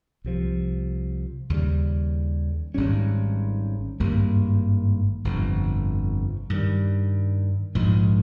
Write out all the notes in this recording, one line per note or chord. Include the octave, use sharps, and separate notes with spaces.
C2 C3 F3
D#2 C#3 G3
G#1 G#2 G3 C#4
G#1 G2 G3 A#3
G1 F2 C3
G2 D#3 G3
A#1 G#2 F3 G#3